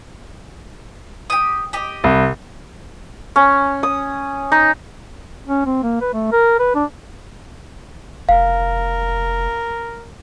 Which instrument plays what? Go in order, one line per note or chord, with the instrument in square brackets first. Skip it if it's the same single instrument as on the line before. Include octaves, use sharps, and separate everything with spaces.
[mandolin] G4 D#6
G4 D#5
[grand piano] C2
[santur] C#4
D#6
D#4
[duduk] C#4
C4
A#3
B4
A3
A#4
B4
D4
[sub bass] F1 [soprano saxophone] A#4 [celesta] F5